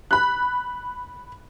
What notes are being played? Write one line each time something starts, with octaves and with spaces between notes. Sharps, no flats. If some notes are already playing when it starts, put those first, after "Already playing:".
B5 F#6